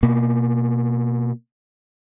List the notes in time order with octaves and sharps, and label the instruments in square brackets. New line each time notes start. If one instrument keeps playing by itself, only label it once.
[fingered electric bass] B2 A#3